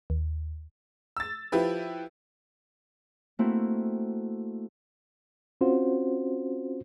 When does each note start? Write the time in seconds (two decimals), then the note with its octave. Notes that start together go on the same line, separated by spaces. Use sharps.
0.10 D#2
1.17 E6 A6
1.52 F3 E4 G4 B4
3.39 A3 A#3 C4 E4 F#4
5.61 C4 C#4 F4 F#4 C5